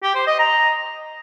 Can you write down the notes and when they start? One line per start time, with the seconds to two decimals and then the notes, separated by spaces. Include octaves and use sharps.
0.03 G4
0.15 C5
0.27 D#5
0.39 A#5